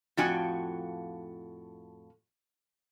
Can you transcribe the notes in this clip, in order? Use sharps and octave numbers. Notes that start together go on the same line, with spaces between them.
F2 A2 F3 F#4 G5 G#5